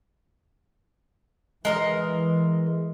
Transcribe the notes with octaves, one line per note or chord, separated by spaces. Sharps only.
E3 G#3 A#4 D#5